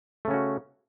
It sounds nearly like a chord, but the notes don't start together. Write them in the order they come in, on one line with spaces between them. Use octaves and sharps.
A3 C#3 C#4 F#4